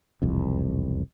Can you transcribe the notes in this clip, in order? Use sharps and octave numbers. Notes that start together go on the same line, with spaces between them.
E1 C2 F2